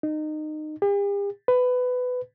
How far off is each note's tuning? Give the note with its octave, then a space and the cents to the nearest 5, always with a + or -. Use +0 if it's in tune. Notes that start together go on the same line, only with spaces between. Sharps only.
D#4 -25
G4 +45
B4 +20